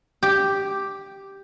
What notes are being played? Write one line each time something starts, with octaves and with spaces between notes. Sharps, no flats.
G4